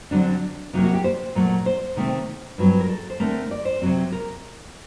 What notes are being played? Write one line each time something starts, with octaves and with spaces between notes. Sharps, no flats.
D3 F#3 A3 C4 D4
C3 F#3 A#3 D#4
F#4
G4
C5
A#2 F#3 A3
C5
C3 D#3 A3 C4
G2 F#3 C4
A#4
A4
C5
D3 A3 C4 A#4
D5
C5
C3 F#3 C4
A#4